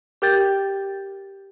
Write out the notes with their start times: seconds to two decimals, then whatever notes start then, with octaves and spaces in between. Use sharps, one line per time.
0.22 G4 A#4 G5 G6 A6